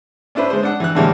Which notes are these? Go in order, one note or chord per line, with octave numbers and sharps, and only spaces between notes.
C#4 D4 E4 B4 C5
G#3 C5
D4 F#5
E3 F#6
A2 D3 E3 G3 G#3 A#3